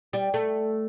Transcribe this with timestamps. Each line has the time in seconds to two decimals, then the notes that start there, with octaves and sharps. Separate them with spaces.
0.13 G3
0.34 A3